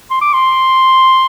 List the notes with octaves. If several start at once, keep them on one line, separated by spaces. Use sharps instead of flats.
C6
D6
C6